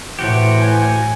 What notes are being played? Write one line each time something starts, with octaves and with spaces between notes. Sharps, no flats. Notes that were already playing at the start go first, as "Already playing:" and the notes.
A2 E3 F#4 G4 C5
G#5